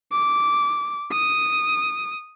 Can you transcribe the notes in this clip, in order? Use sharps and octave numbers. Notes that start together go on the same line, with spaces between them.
D6
D#6